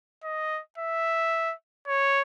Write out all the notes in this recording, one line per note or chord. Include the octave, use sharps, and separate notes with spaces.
D#5
E5
C#5